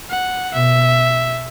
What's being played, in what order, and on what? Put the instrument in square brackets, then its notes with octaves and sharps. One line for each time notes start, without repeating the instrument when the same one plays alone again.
[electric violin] F#5
[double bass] B2 [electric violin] E5